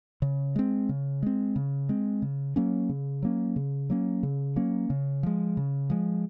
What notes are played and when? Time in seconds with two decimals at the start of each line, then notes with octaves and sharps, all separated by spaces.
0.22 C#3
0.56 G#3 C4
0.89 C#3
1.23 G#3 C4
1.56 C#3
1.89 G#3 C4
2.22 C#3
2.56 F#3 A#3 C#4
2.89 C#3
3.23 F#3 A#3 C#4
3.56 C#3
3.90 F#3 A#3 C#4
4.23 C#3
4.56 F#3 A#3 C#4
4.90 C#3
5.23 F3 G#3
5.57 C#3
5.90 F3 G#3